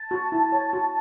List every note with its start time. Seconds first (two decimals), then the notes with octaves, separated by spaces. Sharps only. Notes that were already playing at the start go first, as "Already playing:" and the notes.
Already playing: A5
0.11 F#4
0.32 E4
0.52 C#5
0.73 F#4